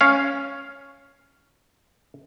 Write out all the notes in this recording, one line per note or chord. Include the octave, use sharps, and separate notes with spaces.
C#4 F5